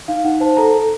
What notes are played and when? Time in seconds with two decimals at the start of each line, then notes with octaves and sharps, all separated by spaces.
0.08 D#4 F5
0.24 D#4 F#5
0.40 C5 A5
0.57 A4 A#5
0.74 A4